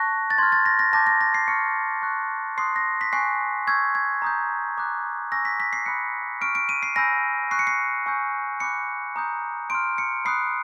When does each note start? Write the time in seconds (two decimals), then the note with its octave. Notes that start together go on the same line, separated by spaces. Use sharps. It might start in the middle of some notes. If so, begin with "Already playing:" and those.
Already playing: A5 C#6 F#6 A#6
0.30 A6
0.38 C6 F6 G#6
0.52 A6
0.66 A#6
0.79 A#6
0.93 A5 D6 G6 A#6
1.07 A#6
1.21 A#6
1.34 C7
1.48 C#6 F6 C#7
2.03 C#6 F#6
2.58 C6 D#6 F#6 C7
2.76 A#6
3.01 B6
3.12 G#5 C#6 F#6 C7
3.67 C#6 E6 G6 G#6
3.95 G#6
4.22 A#5 D#6 G6
4.78 A#5 D6 F#6
5.32 G#5 C#6 E6 G6 A#6
5.45 B6
5.60 B6
5.73 C7
5.86 B5 D#6 F#6 C#7
6.41 C#6 F6 D7
6.55 D7
6.69 D#7
6.83 C7
6.96 G#5 B5 E6 G6 A#6
7.51 C#6 F#6 C7
7.59 C#7
7.67 C7
8.06 G#5 C#6 E6 G6
8.60 B5 D6 F#6 C#7
9.16 A#5 D#6 G6
9.70 C6 F6 D7
9.98 C#7
10.25 B5 D#6 F#6 C7